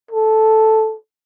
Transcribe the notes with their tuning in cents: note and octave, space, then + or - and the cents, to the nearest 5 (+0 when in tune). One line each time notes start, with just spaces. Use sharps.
A4 -5